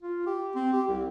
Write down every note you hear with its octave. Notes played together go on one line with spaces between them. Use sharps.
F4
G4
C4
G4
C2